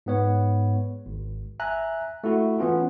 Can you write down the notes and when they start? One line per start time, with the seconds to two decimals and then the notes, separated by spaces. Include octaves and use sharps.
0.06 G#2 B3 C#5
1.06 G#1
1.60 E5 G#5 A#5 F#6
2.24 A3 E4 F#4
2.59 E3 B3 C#4 F4